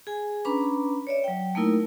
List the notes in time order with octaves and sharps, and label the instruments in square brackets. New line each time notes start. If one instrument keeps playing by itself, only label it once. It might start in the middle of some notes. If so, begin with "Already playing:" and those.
[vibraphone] G#4 G#5
C#4 D4 B4 A#5 B5 D6
C#5 D5 E5
F#3 G5
A3 A#3 D#4 E4 A#4